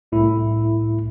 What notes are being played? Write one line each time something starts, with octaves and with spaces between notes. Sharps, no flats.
C2 A2 E4